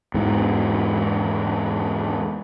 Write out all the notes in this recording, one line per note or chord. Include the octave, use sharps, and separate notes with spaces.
E2 G#2 E3